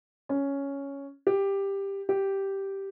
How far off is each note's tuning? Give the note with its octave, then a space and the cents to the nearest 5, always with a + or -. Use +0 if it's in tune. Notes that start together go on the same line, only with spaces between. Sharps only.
C#4 +5
G4 +10
G4 -5